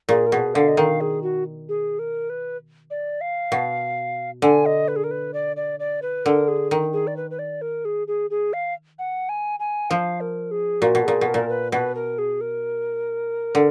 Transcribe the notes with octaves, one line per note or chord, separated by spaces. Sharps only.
A#2 G#4
A#4
B2 G#4
D3 F5
D#5
D#3 F5
G#4
F#4
G#4
A#4
B4
D5
F5
B2
D3 G#5
D#5
B4
G#4
A#4
B4
D5
D5
D5
B4
D3 A#4
G#4
D#3
G#4
D5
B4
B4
D5
A#4
G#4
G#4
G#4
F5
F#5
G#5
G#5
F3 F5
A#4
G#4
A#2 F#4
B2
A#2 G#4
B2
A#4
A#2
B4
B2 B4
A#4
G#4
A#4
D3